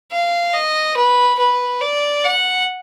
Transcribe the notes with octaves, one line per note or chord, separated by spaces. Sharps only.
F5
D#5
B4
B4
D5
F#5